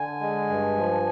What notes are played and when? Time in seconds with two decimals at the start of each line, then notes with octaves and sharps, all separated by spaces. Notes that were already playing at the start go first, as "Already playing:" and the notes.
Already playing: D3 G#5
0.20 G#3
0.49 G2
0.76 F3